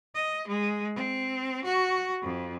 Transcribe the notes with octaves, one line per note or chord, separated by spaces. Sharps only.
D#5
G#3
C4
F#4
F2